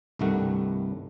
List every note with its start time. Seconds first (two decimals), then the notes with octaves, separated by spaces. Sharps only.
0.19 C2 G2 D#3 G3 A3 F#5